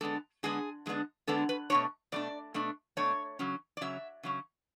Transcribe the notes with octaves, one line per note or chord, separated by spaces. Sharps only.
D3 G#3 B3 D4 A4
D3 G#3 B3 D4 G#4
D3 G#3 B3 D4
D3 G#3 B3 D4 A4
B4
B2 A3 D4 C#5
B2 A3 D4 D5
B2 A3 D4
B2 A3 D4 C#5
C#3 F#3 C#4
D5
C#3 F#3 C#4 E5
C#3 F#3 C#4